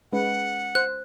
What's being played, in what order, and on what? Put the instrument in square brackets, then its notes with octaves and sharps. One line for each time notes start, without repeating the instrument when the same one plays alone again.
[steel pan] G#3 C#4 B4 [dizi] F#5
[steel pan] C5 [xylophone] F#6